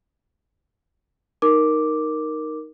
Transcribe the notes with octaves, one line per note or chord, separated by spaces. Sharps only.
D#4 A#4 D6